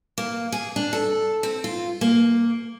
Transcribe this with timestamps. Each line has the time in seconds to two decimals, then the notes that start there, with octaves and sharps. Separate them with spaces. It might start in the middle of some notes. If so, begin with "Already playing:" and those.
0.18 A#3
0.52 G#4
0.76 D4
0.93 A4
1.43 C4
1.64 F4
2.01 A#3